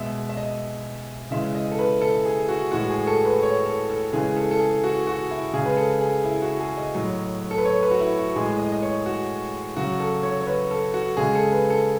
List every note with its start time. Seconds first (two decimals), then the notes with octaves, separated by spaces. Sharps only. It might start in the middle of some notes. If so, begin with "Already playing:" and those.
Already playing: B2 G#3 E5
0.29 E5
0.37 D#5
1.31 C#3 E3 G#3 E5
1.55 D#5
1.71 A4
1.79 B4
2.01 A4
2.25 G#4
2.49 F#4
2.72 A2 E3 G#3 F#4
2.90 G#4
3.07 A4
3.25 B4
3.43 C#5
3.66 A4
3.90 A4
4.13 C#3 E3 G#3 G#4
4.37 A4
4.51 A4
4.60 G#4
4.84 F#4
5.07 F#4
5.30 E4
5.53 C#3 G#3 G#4
5.66 B4
5.77 A4
6.01 G#4
6.24 E4
6.42 F#4
6.60 G#4
6.78 D#5
6.95 A2 F#3
7.51 A4
7.58 B4
7.65 C#5
7.83 B4
7.91 F#4
8.00 E4
8.18 F#4
8.35 A2 E3 G#3 G#4
8.59 D#5
8.72 D#5
8.83 C#5
9.06 F#4
9.76 C#3 F#3 F#4
10.00 A4
10.23 C#5
10.41 C#5
10.47 B4
10.71 A4
10.94 F#4
11.17 C#3 G#3 G#4
11.35 A4
11.52 B4
11.70 A4